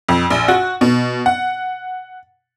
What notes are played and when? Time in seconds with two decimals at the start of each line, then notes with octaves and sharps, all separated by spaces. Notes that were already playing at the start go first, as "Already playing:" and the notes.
0.09 F2
0.30 A#1
0.48 F#4
0.81 B2
1.26 F#5